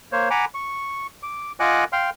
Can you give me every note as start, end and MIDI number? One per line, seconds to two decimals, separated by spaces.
0.12 0.29 58
0.12 0.29 72
0.12 0.29 73
0.30 0.45 78
0.30 0.45 80
0.30 0.45 82
0.30 0.45 83
0.30 0.45 86
0.54 1.07 85
1.23 1.52 86
1.60 1.84 65
1.60 1.84 75
1.60 1.84 78
1.60 1.84 80
1.60 1.84 86
1.60 1.84 90
1.93 2.10 77
1.93 2.10 79
1.93 2.10 84
1.93 2.10 89